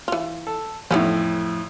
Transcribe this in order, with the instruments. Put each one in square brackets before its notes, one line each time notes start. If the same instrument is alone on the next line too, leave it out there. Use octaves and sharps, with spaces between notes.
[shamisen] E3 F4
[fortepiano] A4
[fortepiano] F2 A2 [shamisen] E3 B3 C#4